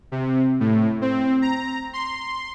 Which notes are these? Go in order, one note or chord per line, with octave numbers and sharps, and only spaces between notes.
C3
A2
C4
A#5
C6